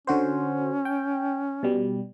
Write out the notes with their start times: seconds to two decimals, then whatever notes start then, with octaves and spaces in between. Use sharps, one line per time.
0.07 D3 C#4 F#4 C5
0.85 G5
1.63 B2 G3